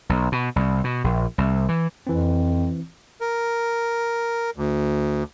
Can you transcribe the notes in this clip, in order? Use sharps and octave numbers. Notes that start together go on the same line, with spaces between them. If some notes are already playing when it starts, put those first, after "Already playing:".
B1
B2
C2
B2
A#1
C2
E3
F2 E3 C4
A#4
D2